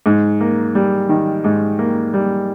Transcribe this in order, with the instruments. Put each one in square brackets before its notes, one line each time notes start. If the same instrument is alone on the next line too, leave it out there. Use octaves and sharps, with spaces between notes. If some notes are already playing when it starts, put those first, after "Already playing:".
[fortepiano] G#2
A#3
G3
D#3
G#2
A#3
G3